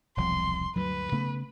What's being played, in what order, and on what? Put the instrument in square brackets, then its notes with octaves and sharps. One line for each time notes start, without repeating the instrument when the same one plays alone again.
[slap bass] E1 C2 F3 [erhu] C6
[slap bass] D2 G2 F#3 [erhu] B4
[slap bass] C#3 A3 B3